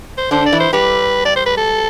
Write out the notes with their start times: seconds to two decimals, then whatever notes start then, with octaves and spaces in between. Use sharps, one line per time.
0.18 C5
0.31 D3 D4 C5
0.46 D5
0.52 E3 E4
0.60 C5
0.73 G3 G4 B4
1.25 D5
1.36 C5
1.46 B4
1.57 A4